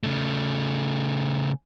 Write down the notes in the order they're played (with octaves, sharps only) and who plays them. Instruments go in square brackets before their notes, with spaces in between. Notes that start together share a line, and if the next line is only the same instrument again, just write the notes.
[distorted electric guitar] C#3 A3